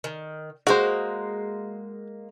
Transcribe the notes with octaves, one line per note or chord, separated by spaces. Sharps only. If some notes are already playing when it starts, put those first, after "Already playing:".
D#3
G#3 A#3 F#4 C5